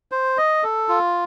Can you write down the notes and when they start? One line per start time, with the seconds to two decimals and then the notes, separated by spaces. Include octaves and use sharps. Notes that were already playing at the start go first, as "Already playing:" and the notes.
0.12 C5
0.38 D#5
0.63 A4
0.89 F4